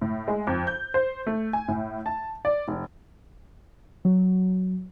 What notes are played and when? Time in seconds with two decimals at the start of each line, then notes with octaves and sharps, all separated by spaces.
0.01 A2
0.28 G#3
0.47 F2
0.67 G6
0.94 C5
1.27 A3
1.53 G#5
1.68 A2
2.06 A5
2.45 D5
2.68 F1
4.05 F#3